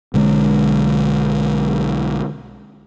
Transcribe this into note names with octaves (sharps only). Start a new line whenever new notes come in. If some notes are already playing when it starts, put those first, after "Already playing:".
B1 D3 G#3